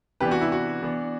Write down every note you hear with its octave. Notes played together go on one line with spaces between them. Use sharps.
C3 E3 B3 D4 G4 B4
F#4
E4
F#4
E3 B3 D4